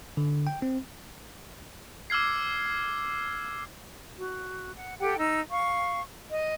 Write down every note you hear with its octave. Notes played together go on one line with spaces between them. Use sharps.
D3
G5
C4
D6 E6 F6 G#6 C7
F#4
F#5
G4 A4 F#5 G5
D#4 E6
F5 C#6
D#5